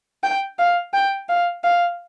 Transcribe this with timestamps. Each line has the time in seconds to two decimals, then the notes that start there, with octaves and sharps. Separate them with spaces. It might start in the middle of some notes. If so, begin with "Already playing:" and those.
0.23 G5
0.58 F5
0.93 G5
1.29 F5
1.64 F5